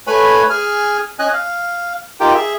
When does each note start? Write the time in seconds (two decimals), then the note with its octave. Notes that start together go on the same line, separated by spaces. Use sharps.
0.07 A3 B4 C#5 G#5 B5
0.50 G#4 G#5 F6
1.19 C#4 D#5 G#5 F#6
1.33 F5
2.20 D#4 F4 G4 A#4 G5
2.35 G#4 E5